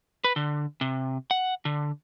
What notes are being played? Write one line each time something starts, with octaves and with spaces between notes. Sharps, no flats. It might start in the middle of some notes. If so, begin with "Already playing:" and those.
B4
D3
C3
F#5
D3